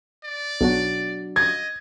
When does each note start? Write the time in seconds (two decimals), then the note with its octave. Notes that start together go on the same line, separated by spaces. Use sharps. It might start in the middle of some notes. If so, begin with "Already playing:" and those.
0.24 D5
0.61 B1 F#3 D4 F#4
1.36 D#5 G#6